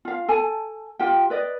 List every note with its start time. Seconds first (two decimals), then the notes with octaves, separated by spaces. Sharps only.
0.05 F4 F5
0.28 A4 G#5 A5
0.99 F4 G4 G5
1.30 B4 D5 D#5